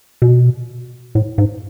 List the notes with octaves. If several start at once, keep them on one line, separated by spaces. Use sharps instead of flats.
B2
A2
G#2